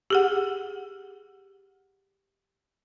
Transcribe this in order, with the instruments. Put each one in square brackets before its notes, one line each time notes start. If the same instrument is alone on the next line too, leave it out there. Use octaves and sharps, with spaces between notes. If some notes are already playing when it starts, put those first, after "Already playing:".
[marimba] G4 G#4 F#5